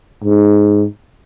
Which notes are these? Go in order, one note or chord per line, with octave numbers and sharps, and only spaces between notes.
G#2